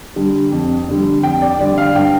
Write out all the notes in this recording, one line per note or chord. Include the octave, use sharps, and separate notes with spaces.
D3 G3
F2
D3 G3
F2 G5
D5
D3 G3 D5
F5
G2 G5